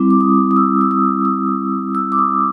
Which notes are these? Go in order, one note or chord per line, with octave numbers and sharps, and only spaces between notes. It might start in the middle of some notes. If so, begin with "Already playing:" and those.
Already playing: G3 C4 E4 D6
D6
D#6
D#6
E6
E6
D#6
D#6
E6
D6
D#6